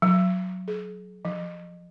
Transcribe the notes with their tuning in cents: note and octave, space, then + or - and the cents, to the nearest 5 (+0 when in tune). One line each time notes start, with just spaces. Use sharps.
F#3 -5
G#4 +40
F3 +5